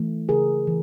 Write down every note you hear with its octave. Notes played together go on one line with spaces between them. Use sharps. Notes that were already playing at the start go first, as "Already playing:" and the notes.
Already playing: E3 A3
C#3 G#4 A#4
E3